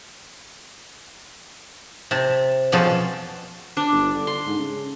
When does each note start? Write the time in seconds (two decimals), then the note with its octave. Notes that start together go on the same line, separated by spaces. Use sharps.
2.11 C3 A5
2.72 F2 B2 F3 C#4 G#4 A5
3.77 D4
3.92 G1
4.14 D3
4.27 C6
4.46 G#2
4.58 C#3